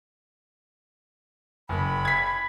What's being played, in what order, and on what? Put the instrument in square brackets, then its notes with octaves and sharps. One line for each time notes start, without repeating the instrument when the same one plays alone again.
[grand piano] F#1 [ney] B5
[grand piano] G#6 B6